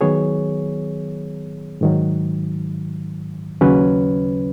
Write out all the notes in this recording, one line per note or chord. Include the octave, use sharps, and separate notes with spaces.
D#3 F#3 B3 G#4 C#5
G#2 D#3 F#3
D#2 C#3 F#3 C#4 B4